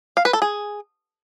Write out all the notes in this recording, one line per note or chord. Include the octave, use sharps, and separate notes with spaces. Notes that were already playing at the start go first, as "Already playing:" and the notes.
F5
B4
A4
G#4